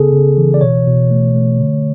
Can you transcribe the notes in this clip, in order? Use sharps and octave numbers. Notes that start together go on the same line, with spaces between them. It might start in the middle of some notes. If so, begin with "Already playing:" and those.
Already playing: C#3 B3 G#4 A4
C#3
E3
D5
B2 C#5
B2
A3
A3
D3